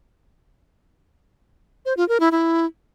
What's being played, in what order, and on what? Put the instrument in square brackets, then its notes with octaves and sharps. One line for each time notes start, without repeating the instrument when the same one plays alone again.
[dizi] C5
F4
A#4
E4
E4